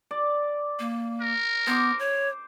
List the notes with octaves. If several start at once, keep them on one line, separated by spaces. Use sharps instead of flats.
D5
A#3
A#4
B3 C5 D6
C#5